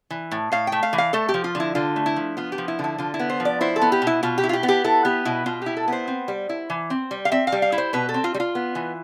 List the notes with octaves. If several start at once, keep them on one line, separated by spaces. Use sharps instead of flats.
E3
A2
A2 F5
G5
A3
F5
E3
F5
A3 A4
G4
F3
F4
D3
E4
D3 F4
A3
E4
F3
B3 F4
G4
F3
E4
D3
E4
D3 F4
E4
B3
C5
F3
D5
E4 C5
A4
B3
G4
B2
E4
B2 F4
G4
E4
F4
G4
B3
G4
E4 A4
B3 G4
B2 E4
B2 F4
E4 G4
A4
B3 C5
C4
G3
E4
E3
C4
G3
F5
C4 E5
F5
G3
F5
E4
C5
B2 B4
A4
C4
F4
G3
F4
B3
E3